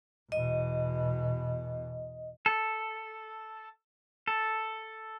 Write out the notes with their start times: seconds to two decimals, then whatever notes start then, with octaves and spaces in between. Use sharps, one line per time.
0.32 E2 B2 D#5
2.46 A4
4.28 A4